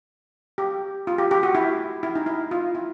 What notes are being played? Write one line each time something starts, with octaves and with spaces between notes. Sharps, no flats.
G4
F4
G4
G4
F#4
E4
E4
D#4
E4
F4
E4